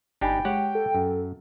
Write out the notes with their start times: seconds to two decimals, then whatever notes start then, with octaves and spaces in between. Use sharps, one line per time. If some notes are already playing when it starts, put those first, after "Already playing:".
0.21 G1 D4 D#4 G4 G5 G#5 B5
0.45 G#3 G4 C#5 F#5
0.75 A4
0.95 F#2